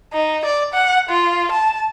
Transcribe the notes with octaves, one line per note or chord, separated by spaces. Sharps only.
D#4
D5
F#5
F4
A5